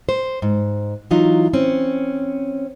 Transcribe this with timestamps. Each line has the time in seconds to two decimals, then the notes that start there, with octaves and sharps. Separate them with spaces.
0.09 C5
0.42 G#2
1.11 E3 F#3 D#4 F4
1.53 C4 C#4